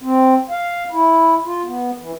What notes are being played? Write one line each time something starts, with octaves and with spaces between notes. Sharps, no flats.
C4
F5
E4
F4
B3
E3